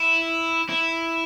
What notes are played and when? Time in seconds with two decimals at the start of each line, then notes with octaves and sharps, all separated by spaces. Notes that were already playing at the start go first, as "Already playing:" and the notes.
Already playing: E4
0.69 E4